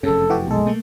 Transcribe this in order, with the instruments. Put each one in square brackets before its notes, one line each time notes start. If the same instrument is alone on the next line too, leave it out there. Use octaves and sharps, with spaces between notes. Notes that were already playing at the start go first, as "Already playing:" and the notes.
[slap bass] F1 F#2 [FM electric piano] C#3 [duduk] A4
[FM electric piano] E3 F#4 G4
[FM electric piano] B1 A4 [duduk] G#3
[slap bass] A3 A#3